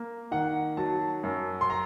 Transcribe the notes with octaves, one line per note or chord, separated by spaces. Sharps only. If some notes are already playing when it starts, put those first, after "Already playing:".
Already playing: A#3
D#3 F#5
F#3 A5
F#2
C6
A#5